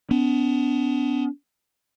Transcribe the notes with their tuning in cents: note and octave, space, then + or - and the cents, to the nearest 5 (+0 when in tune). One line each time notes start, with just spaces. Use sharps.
B3 +25 D4 -35